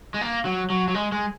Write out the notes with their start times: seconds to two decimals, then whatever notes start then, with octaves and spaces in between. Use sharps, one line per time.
0.14 G#3
0.21 A#3
0.45 F#3
0.70 F#3
0.88 F#3
0.95 G#3
1.12 G#3